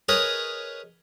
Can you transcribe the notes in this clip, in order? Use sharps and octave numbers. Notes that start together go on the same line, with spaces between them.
G#4 A#4 B4 C#5 D#5